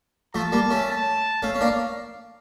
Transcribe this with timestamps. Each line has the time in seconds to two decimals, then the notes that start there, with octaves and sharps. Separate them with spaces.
0.34 F3 A3 A5
0.52 G3 A#3
0.70 A3 C#4
0.89 A5
1.42 A3 C#4 F5
1.55 C#4
1.61 A#3 D4